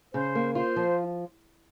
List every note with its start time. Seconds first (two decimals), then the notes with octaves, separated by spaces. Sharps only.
0.13 C#3 C5
0.35 A#3
0.55 F4 C5
0.76 F3